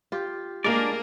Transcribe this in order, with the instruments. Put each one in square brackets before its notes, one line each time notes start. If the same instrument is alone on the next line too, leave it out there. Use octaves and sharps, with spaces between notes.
[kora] F4 G4
[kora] G#3 G#4 [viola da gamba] A#3 [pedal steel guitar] D4 A#4 D5